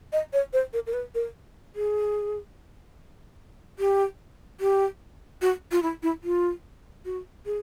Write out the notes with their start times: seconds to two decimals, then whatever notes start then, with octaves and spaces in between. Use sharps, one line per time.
0.13 D#5
0.33 C#5
0.53 C5
0.73 A#4
0.87 A#4
0.94 B4
1.15 A#4
1.75 G#4
3.79 G4
4.60 G4
5.42 F#4
5.72 F4
5.83 E4
6.03 E4
6.24 F4
7.05 F#4
7.46 G#4